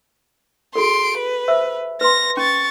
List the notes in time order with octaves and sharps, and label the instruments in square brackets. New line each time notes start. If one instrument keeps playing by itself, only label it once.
[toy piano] F#4 G#4 A4 [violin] C6 D7
[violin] B4
[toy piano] C5 E5 E6
[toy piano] B4 C6 [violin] A#6
[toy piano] C#4 [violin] C#6 A6